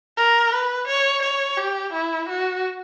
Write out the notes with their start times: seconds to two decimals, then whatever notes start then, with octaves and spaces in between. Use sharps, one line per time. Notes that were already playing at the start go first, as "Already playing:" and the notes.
0.17 A#4
0.52 B4
0.88 C#5
1.23 C#5
1.58 G4
1.93 E4
2.29 F#4